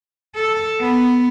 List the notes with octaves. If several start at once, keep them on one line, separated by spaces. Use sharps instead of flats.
A4
B3